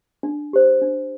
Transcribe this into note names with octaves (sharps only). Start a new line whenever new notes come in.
D4
G4 C5
D4